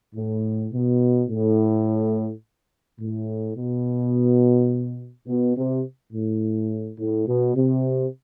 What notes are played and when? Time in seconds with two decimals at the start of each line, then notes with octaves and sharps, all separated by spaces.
0.15 A2
0.71 B2
1.28 A2
2.99 A2
3.55 B2
5.26 B2
5.56 C3
6.12 A2
6.98 A2
7.26 B2
7.54 C3